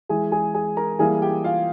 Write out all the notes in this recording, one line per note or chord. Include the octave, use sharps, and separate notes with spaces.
E3 G#3 G#4 G#5
G#4 G#5
G#4 G#5
A#4 A#5
E3 G3 A#3 G#4 G#5
G4 G5
F4 F5